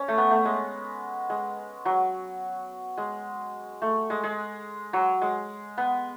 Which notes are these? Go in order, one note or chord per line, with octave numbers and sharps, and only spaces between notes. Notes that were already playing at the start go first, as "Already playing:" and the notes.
Already playing: C#4
A3
B3
A3
G#3
G#3
F#3
G#3
A3
G#3
G#3
F#3
G#3
B3